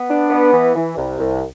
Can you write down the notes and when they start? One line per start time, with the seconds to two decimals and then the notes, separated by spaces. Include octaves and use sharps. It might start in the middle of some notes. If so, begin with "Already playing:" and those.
Already playing: B3
0.09 D4
0.30 B3
0.52 E3
0.75 E3
0.97 C2
1.19 C2